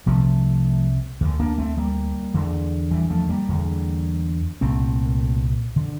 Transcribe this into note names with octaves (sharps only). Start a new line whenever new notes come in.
C2 C3 F3 A3
D2 D3
A#3 D4
A3 C4
G3 A#3
E2 D3
E3 G3
F3 A3
G3 A#3
E2 D3
C2 A#2 A3 C4
D3